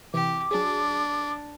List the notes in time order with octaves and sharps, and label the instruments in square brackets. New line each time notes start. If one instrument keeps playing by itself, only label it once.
[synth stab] C3 E3 [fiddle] G4 [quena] D6
[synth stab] F#3 G#4 [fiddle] D4